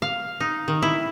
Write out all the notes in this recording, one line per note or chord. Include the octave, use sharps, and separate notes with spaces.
F5
D#4
D#3
E4